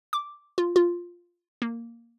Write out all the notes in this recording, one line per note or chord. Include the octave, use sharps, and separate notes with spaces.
D6
F4
F4
A#3